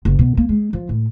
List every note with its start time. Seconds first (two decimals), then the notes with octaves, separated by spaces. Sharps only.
0.05 F#1
0.19 B2
0.37 A#3
0.49 G#3
0.73 F3
0.89 A2